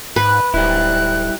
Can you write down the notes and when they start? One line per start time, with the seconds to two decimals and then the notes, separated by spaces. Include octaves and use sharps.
0.16 G#2 B4 F#6
0.54 D1 G3 D#4 E4 F#6